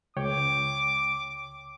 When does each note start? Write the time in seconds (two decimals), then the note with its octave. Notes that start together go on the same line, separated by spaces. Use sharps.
0.16 C#2 C#5 G5 D6